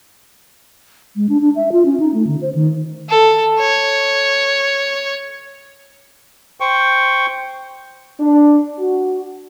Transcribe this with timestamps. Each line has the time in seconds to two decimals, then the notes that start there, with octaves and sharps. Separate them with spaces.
1.16 G#3
1.29 D4
1.41 D4
1.56 E5
1.72 F4
1.86 C#4
2.00 D#4
2.14 A3
2.27 D3
2.42 C5
2.55 D#3
3.09 A4
3.60 C#5
6.60 C5 G5 C#6
8.19 D4
8.79 F#4